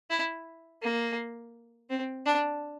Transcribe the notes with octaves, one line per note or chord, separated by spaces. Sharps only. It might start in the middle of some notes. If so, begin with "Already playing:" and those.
E4
A#3
C4
D4